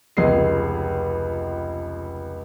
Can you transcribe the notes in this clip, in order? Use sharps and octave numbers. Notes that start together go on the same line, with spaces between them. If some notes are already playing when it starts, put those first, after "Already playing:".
F1 C#2 G#4 C7